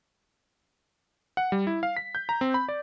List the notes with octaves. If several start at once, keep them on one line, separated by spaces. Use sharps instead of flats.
F#5
G3
E4
F5
B6
G6
A#5
C4
B5
D5